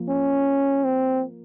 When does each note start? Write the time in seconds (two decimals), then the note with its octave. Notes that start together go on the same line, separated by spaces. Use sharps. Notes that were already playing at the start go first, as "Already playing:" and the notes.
Already playing: F3 A#3
0.09 C#4
0.84 C4